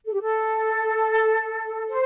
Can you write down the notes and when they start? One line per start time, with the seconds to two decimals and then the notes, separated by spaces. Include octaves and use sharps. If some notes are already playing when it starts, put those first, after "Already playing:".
0.06 A4
0.14 G4
0.22 A4
1.88 C5